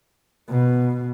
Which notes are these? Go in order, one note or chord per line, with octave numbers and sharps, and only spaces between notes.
B2